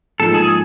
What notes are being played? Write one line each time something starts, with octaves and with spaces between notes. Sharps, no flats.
G#2 F3 A#3 D#4 G#4 A4
G#4